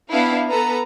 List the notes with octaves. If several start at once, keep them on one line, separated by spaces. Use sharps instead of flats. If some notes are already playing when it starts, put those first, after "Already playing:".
B3 D4 E4 F5
B3 A4 B4 A#5